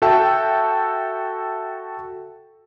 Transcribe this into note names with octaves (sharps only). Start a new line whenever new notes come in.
F#4 A4 E5 G5 A5